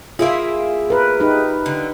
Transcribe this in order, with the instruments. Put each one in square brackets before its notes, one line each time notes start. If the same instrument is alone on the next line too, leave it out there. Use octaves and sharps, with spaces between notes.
[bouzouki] A#3 E4 G#4 [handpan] F4 E5
[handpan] A#4 B4
D#4 G4 B4
[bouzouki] D3